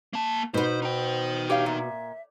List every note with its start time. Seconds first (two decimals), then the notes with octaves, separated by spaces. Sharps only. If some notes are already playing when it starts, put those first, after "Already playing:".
0.13 A#3 A5
0.54 B2 B3 D#4 C5
0.82 D#4 C5 G5
1.50 G4 C#5 F5
1.66 A#2 E5